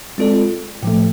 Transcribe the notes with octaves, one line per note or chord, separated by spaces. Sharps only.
G#3 C4 F4 A4 D5
A2 F3 A3